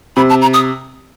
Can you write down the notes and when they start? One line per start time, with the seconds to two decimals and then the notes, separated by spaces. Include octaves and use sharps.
0.16 C3 B5
0.29 A5
0.41 A#5
0.54 D#6